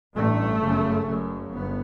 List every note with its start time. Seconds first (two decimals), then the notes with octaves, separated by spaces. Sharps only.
0.16 A1 G2 A3
0.61 G1 F#2 C#3
1.06 F#1 F#2 C#3
1.52 G1 B3